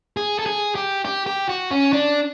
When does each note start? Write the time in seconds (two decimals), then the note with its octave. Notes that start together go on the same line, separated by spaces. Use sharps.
0.17 G#4
0.39 A4
0.46 G#4
0.75 G4
1.05 G4
1.27 G4
1.49 F#4
1.71 C#4
1.93 D4